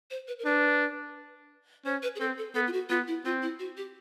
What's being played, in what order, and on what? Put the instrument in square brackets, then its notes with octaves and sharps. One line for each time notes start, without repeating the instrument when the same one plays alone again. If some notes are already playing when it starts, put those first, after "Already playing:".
[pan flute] C5
B4
A#4
[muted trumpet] D4 [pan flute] B4
[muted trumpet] C#4 [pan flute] C5
[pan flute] B4
G#4
[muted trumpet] C4 [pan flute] A4
[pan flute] A4
[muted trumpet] B3 [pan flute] A4
[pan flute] F4
F#4
[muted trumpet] B3 [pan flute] F4
[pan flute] E4
[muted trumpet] C4 [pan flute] F4
[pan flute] E4
F#4
G4